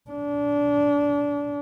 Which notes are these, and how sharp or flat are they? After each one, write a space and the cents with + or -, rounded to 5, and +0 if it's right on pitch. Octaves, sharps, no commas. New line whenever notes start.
D4 -25